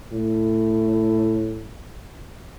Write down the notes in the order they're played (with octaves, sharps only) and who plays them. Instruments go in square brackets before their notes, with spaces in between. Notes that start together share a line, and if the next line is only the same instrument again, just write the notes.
[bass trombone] A2